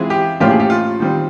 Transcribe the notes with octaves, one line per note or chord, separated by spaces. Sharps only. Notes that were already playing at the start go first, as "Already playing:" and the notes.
Already playing: E3 G#3 C4 F4 G#4
G4
A2 F3 A#3 C#4 F4 G4
G#4
G4
F4
D#3 G3 C4